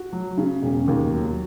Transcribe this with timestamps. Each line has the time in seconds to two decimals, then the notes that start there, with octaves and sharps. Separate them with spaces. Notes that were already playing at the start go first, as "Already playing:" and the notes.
Already playing: F#4
0.12 F#3
0.38 C#3
0.62 E1
0.88 D#2
1.13 F#3